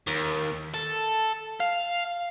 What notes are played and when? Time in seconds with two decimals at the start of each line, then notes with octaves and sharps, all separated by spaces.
0.07 D#2
0.74 A4
1.60 F5